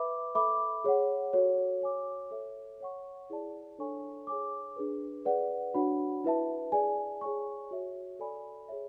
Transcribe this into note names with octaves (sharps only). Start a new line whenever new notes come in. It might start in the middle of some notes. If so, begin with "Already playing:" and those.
Already playing: B4 E5 B5 D6
A4 E5 B5 D6
G#4 C#5 F#5
F#4 A4 C#5
C#5 G#5 D6
A4 C#5 E5
C#5 F#5 C#6
E4 G#4 D5 A5
D4 A4 C#5 G#5 C#6
G#4 C#5 G#5 D6
D4 G#4 B4
G#4 B4 D5 F#5
D4 F#4 C#5 F#5 B5
E4 B4 E5 A5
G#4 D5 G#5
G#4 C#5 G#5 C#6
F#4 C#5 E5
A4 D5 G#5 B5
G#4 C#5 E5